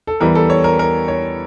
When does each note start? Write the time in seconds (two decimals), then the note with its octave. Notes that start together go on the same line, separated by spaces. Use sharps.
0.07 A4
0.20 E2 E3 G3 A#4
0.35 A4
0.50 C#5
0.64 A#4
0.79 A#4
1.08 C#5